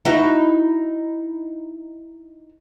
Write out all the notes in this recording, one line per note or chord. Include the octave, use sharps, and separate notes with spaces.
D#4 E4 F#4